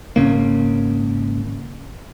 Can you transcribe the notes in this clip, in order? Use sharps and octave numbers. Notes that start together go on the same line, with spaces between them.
G#1 C#3 A#3